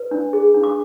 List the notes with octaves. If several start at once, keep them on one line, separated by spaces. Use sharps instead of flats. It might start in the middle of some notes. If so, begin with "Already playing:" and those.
Already playing: B4
D4
G#4
D4
D6